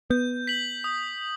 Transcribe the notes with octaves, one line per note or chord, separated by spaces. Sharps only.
B3 G6
B6 F#7
D#6